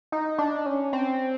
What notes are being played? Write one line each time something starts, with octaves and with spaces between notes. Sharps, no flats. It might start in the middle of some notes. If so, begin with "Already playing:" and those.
D#4
D4
C#4
C4